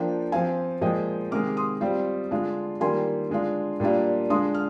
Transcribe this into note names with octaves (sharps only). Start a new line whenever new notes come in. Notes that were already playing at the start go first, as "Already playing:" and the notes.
Already playing: F3 A#3 D4 F4 G5
F3 C4 F4 F5 G#5
A#2 F3 G#3 D#5 G5
C3 D#3 G#3 D6 F6
C6 D#6
G3 C4 F4
D3 G#3 D4 F4
D#3 G3 A#3 F4 G#5 C6
D3 G#3 D4 F4
A#2 G3 A#3 D4 F4
D3 G#3 D4 F4 C6 D#6
F6